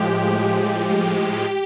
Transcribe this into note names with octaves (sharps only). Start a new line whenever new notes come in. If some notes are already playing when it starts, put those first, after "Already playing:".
Already playing: A2 F3 G#3 G4
G4